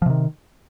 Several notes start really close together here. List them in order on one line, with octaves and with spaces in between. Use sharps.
F3 C3 D#3